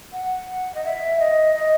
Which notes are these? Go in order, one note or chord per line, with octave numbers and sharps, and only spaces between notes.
F#5
D#5
E5
D#5
D#5